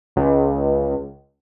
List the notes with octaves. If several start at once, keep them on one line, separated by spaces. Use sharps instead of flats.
C#2